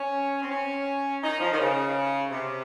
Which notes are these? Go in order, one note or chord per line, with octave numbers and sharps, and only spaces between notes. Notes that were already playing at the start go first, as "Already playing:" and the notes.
Already playing: C#4
C4
C#4
D#4
F3
D#3
C#3
C3